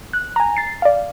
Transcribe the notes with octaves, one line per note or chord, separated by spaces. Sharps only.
F#6
G#5 A#5
A6 C7
D5 F5